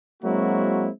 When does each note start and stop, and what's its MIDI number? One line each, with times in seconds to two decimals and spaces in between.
0.23 0.89 54
0.23 0.89 56
0.23 0.89 58
0.23 0.89 60
0.23 0.89 64
0.23 0.89 66